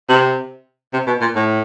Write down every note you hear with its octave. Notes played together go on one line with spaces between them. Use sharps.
C3
C3
B2
A#2
A2